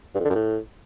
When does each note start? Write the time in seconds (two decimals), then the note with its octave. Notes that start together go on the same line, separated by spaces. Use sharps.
0.15 G2
0.20 F2
0.25 D3
0.30 F#2
0.35 A2